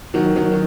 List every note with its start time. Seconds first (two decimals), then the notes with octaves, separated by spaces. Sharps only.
0.14 D#3 F#3
0.36 D#3 F#3
0.52 D#3